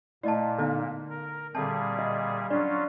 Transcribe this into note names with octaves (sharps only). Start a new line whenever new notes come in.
A#2 A3 E4 D5 D#5 A5
D3 B3 D#4
A#4
A#2 D3 G3 C4 G#4 E5 G5 A5
F#4 D#5 E5
F#3 C#4 D4 F4 D5 B5